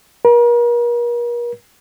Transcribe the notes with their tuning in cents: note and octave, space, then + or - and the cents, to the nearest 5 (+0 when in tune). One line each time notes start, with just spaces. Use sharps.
A#4 +40